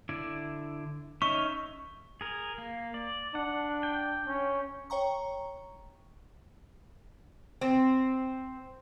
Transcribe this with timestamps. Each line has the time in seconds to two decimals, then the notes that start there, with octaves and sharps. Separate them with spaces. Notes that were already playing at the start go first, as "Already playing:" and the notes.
0.09 D3 E4 D5
1.22 C#4 D#4 E5 C#6
2.21 G#4 A#4
2.58 A#3
2.94 D5
3.35 D4 F#5
3.83 G5
4.27 C#4
4.90 C#5 G5 A#5 C#6
7.61 C4